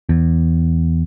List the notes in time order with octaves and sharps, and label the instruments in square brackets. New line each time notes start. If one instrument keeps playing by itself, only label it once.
[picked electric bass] E2